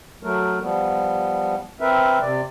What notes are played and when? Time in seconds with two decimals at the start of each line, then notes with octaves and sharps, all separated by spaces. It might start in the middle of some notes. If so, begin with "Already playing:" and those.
0.23 F#3 A3 A#4
0.62 F3 G3 B3
1.81 C4 A#4 B4 E5
2.21 C3 D5